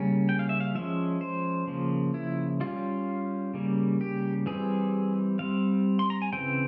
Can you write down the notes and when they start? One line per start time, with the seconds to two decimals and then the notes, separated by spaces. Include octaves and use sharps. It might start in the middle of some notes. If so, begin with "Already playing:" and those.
Already playing: C#3 G3 A#3 C#4
0.29 G5
0.39 F5
0.49 E5
0.60 F5
0.75 F3 G#3 C#4 E5
1.21 C5
1.68 C#3 F3 A#3
2.14 E4
2.60 G3 C#4 F4
3.54 C#3 G3 A#3
4.01 G4
4.46 E3 G3 C4 G#4
5.39 G3 C4 F5
5.99 C6
6.10 A#5
6.22 G#5
6.33 C#3 E3 G3 C4 G5